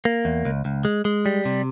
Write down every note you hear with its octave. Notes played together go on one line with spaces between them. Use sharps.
A#3
E2
C#2
C#2
G#3
G#3
G3
C3